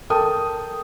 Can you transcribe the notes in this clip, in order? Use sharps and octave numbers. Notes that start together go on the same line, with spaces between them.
A4 A#4 G5 A5 D#6